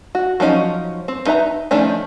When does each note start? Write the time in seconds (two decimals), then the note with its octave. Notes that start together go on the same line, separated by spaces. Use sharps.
0.15 F#4
0.40 F3 F#3 C#4 D#4
1.08 C4
1.26 D#4 B4 E5 A#5
1.71 D#3 F3 A3 C#4 D4